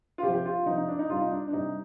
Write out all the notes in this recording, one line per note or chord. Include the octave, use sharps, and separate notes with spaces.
F4
C3 F3 G4
G4
F4
C3 F3 D#4
D#4
D4
D#4
C3 G3 F4
D#4
D4
D4
C3 G3 D#4